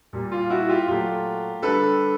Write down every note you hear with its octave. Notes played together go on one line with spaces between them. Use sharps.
A#2 G3
F4
E4 F#4
F4 G4
A#2 F#3 A3 F4 G4
D3 G3 A4 B4